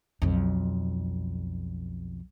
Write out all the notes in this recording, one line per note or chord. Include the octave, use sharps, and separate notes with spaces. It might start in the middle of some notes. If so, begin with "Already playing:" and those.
B1 F2